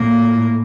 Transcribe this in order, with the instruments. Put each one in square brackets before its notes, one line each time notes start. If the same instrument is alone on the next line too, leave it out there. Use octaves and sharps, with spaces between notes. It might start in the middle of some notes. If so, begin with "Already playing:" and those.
Already playing: [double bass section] A2 [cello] A#3